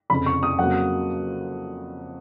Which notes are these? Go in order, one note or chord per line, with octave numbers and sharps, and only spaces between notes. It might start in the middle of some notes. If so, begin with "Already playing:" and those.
F1 F2 C#3 B5
C#6
D#6
F2 C#3 F#3 A#3 F#5